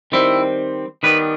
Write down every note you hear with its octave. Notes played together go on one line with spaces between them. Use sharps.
D#3 G3 C4 E4
D#3 G3 B3 B4